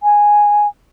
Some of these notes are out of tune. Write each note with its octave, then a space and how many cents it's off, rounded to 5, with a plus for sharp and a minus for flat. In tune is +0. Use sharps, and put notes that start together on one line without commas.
G#5 -5